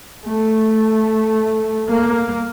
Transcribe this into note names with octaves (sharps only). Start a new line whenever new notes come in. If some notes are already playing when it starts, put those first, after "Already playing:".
A3
A#3